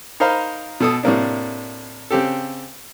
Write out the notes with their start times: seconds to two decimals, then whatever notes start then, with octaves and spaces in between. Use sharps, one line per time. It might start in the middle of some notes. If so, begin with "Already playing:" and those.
0.20 D#4 A#4 C5 D#5 F5 B5
0.80 B2 A4 D#6
1.03 A2 C3 A#3 D4
2.11 C#3 C4 G4 A4